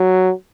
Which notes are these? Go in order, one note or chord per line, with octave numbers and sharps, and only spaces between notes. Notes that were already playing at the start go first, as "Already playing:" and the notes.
Already playing: F#3